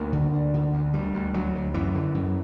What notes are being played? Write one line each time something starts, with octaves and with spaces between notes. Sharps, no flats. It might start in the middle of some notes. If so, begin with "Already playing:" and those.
Already playing: D2 A#3
D3
D2
D3
D2
D2 G3
D2
D2 F#3
D2
F#2 E3
D3
F#2